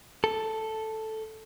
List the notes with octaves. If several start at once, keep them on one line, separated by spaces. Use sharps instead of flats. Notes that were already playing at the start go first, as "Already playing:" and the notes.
A4